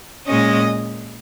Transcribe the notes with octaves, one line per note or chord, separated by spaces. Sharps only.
A#2 G#3 C#4 D#5